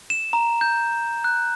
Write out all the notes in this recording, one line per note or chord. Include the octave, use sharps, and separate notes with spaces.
E7
A#5
G6
F#6